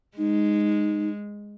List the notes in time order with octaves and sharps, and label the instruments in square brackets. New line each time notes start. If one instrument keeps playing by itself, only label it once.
[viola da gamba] G#3 [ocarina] D#4